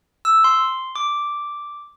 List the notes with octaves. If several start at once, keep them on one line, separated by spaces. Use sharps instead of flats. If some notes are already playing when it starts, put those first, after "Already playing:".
E6
C6
D6